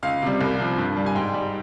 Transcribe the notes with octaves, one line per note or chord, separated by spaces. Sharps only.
C#2 F5
C3 G3
C2
C3 F3
G2
G3
G#5
G#2 G5
G3